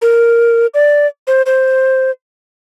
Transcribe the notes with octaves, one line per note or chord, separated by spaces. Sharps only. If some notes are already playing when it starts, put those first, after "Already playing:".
A#4
D5
C5
C5